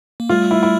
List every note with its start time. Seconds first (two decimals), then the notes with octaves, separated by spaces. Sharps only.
0.20 A#3
0.29 G3 A3 F4
0.51 E4
0.63 E4